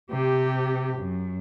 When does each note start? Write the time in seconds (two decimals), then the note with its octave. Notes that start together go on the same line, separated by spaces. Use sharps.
0.11 C3 G4
0.99 F#2